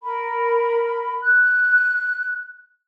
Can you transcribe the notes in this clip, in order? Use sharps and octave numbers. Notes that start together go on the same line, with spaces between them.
A#4 B5
F#6